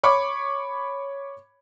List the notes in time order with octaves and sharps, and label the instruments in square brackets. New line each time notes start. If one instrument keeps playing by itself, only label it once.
[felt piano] C#5 B5 C#6 D6